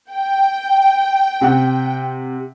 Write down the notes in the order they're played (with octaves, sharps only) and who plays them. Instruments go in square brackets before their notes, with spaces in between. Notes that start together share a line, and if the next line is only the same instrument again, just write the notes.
[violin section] G5
[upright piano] C3 F#5